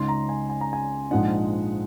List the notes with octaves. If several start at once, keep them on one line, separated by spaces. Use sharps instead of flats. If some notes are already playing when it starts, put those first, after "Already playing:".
Already playing: C#2 C#3 G#3 D#4 C6
A#5
G#5
G#5
A#5
G#5
A#1 G#2 F3 G#3 D#4 F#5